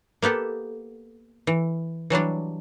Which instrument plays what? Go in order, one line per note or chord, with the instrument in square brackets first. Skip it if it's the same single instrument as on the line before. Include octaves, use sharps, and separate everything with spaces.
[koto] A#3 B3 G4 A4
E3
E3 F#3 G3 D4